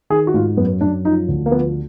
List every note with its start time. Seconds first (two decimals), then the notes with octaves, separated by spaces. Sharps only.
0.10 D#3 G#4
0.27 F#4
0.34 G#2 F4
0.57 F#2 B3
0.81 F#2 D4
1.05 F3 D#4
1.29 D2
1.46 A#3
1.51 F3 B3